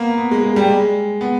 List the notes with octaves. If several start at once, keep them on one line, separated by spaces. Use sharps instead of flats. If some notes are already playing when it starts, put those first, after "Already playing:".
Already playing: A#3 B3
B3
G#3
G#3
G3
G#3
B3